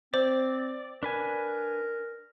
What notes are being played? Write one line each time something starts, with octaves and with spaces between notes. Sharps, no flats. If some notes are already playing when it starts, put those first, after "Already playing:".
C4 C5 D5
D4 A#4 B4 G#5